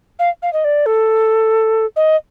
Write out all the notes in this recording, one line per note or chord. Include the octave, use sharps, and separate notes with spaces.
F5
F5
D#5
D5
A4
D#5